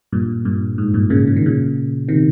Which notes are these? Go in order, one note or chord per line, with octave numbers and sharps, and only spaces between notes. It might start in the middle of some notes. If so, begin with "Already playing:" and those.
G2 A#2
G2 A#2
G#2
G2 A#2
A#2 C#3
C#3
D#3
A#2 C#3
C3 D#3